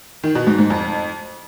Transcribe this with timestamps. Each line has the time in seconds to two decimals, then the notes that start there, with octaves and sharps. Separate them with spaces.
0.24 D#3
0.35 B2
0.47 G#2
0.59 G#2
0.70 F2